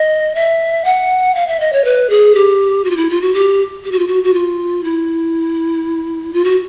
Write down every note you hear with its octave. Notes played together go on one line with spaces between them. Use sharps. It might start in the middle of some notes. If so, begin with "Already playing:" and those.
Already playing: D#5
E5
F#5
F5
E5
D#5
C#5
B4
G#4
G4
F#4
F4
E4
F4
F#4
G4
G4
F#4
F4
F#4
F#4
F4
E4
F4
F#4